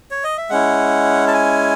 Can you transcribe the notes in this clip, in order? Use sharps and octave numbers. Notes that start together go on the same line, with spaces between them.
C#5
D#5
E5
G#3 C#4 E4 F#5
A5
G#5